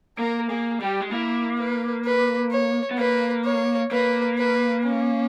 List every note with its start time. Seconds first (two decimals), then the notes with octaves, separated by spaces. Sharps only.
0.18 A#3 A#4
0.50 A#3 G#4
0.81 G3 G4
1.01 G#3
1.11 A#3 E4
1.58 B4
2.05 B4
2.51 C#5
2.91 B3
2.98 A#3 B4
3.45 C#5
3.91 A#3 B4
4.38 B4
4.85 C#4